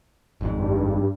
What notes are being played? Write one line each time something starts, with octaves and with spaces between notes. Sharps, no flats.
G#1 F2 G#2
G2